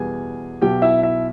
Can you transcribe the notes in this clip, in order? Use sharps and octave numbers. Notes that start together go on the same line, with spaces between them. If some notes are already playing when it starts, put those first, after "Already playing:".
Already playing: E2 B2 G3 G#4 G#5
B1 B2 F#3 G4 G5
E4 E5
E4 E5